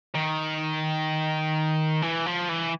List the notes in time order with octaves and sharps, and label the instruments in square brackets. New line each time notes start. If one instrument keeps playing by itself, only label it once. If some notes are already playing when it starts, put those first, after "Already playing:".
[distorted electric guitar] D#3
E3
F3
E3